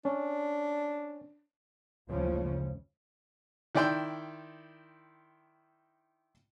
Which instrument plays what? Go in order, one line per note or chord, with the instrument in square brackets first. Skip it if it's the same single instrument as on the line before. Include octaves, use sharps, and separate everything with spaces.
[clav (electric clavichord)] C#4 [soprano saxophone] D4
[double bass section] F#1 D2 C#3 F3 G#3 C#4
[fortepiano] D#3 E4 D5 G5 C6 E6